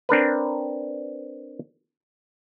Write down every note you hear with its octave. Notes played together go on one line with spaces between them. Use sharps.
C4 D4 A#4 B4